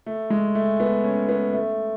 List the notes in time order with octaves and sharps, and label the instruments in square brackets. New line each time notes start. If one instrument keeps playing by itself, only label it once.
[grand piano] A3
G#3
A3
B3
C#4
B3
A3